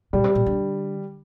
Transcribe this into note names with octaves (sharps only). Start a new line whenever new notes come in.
A#2 G3
C3
A#2
D3